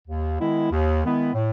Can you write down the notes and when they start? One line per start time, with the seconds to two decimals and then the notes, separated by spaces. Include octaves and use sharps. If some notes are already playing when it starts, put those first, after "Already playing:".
0.08 D#2
0.40 D#3 G#3 B3 E4
0.71 D#2
1.02 D#3 G#3 B3 E4
1.34 A2